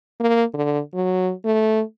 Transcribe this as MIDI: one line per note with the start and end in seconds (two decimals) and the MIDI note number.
0.21 0.44 58
0.54 0.80 50
0.95 1.32 54
1.45 1.82 57